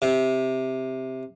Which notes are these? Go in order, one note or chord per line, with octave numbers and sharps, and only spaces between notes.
C3